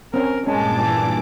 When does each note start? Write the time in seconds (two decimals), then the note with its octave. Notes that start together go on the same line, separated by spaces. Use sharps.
0.14 C4 C#4 A#4
0.47 G2 A#2 G#3 C#4 A5 D6
0.82 E3